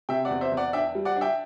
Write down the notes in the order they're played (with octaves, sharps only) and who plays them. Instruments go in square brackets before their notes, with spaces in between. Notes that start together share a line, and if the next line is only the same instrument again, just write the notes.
[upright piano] C3 E5 G5
D5 F#5
E2
C5 E5
E2
D5 F#5
D4 E5 G5
G3
D5 F#5
D4
E5 G5